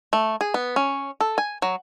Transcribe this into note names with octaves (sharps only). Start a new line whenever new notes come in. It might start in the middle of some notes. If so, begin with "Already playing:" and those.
A3
G#4
B3
C#4
A4
G#5
F#3